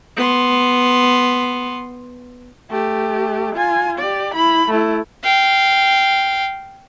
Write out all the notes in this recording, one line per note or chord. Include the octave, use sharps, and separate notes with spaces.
B3 C6
A3 G4
F4 G#5
G4 D5
E4 B5
A3 E4
F5 G5